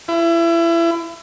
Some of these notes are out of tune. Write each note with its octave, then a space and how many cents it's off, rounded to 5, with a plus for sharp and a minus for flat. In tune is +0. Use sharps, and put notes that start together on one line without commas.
E4 +30